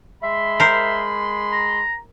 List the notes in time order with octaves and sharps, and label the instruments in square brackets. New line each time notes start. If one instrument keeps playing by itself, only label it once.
[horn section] G#3 B5 C6 [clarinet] E5
[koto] A#4 C5
[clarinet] A#5